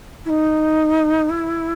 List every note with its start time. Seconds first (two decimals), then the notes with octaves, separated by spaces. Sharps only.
0.25 E4
0.29 D#4
1.29 E4